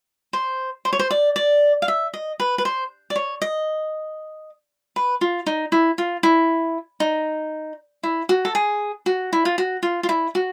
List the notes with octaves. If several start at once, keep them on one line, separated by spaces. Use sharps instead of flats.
C5
C5
C#5
C5
D5
D5
F5
E5
D#5
B4
B4
C5
D5
C#5
D#5
B4
F4
D#4
E4
F4
E4
D#4
E4
F#4
A4
G#4
F#4
E4
F4
F#4
F4
F4
E4
F#4